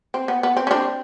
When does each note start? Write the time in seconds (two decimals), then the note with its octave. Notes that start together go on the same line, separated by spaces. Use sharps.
0.14 C4
0.28 B3
0.43 B3
0.57 C4
0.67 C#4
0.71 C4 D4